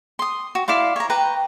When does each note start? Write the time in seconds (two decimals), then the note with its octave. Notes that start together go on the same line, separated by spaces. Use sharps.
0.19 C6 D#6
0.55 F#4
0.68 E4 D5 F5 C6
0.96 C#5 A#5
1.10 B4 G5 A#5